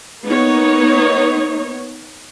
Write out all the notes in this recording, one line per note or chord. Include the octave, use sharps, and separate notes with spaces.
A#3 B3 D#4 C#5